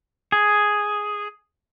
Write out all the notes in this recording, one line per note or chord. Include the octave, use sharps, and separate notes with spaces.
G#4